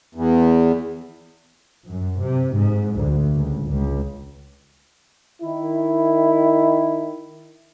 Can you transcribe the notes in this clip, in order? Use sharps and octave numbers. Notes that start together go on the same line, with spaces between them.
E2
F#2
C3
G#2
D2
C#2
C#2
D#3 E4